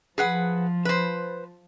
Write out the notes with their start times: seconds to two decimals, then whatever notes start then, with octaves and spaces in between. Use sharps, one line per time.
0.18 F3 G#4 B4 F#5
0.85 B4 C5